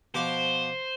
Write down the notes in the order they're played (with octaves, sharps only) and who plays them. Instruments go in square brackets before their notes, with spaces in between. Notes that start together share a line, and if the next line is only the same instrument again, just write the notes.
[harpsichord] B2 F3 D6 [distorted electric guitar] C5